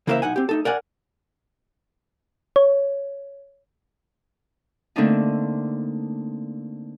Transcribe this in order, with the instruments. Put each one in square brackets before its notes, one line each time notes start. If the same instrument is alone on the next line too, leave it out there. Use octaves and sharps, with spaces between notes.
[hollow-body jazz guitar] C#3 E3 A#3 A#4 C5 E5
B1 D#4 F#5 G#5
C4 G4
A3 D#4 A4
A#4 D5 F#5 G#5
[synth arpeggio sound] C#5
[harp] D3 A3 A#3 C4 D4 D#4